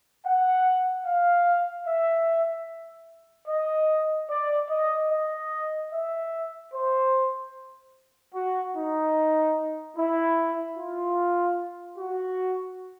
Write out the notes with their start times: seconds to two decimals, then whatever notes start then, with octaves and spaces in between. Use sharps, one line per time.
0.24 F#5
1.05 F5
1.85 E5
3.47 D#5
4.29 D5
4.69 D#5
5.10 D#5
5.90 E5
6.71 C5
8.33 F#4
8.74 D#4
9.95 E4
10.76 F4
11.98 F#4